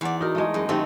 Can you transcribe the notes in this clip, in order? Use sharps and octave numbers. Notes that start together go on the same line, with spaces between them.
E2 D5 F#5
D#4 F#4 A#4
G#3 A3
F#2 G#4
D#3 A3 C4 G4